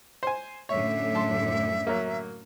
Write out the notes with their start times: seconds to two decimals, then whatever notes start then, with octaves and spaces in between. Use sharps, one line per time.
0.23 C5 G#5
0.69 F#2 A2 D3 C#5 E5
1.15 A5 C6
1.87 F#3 A#3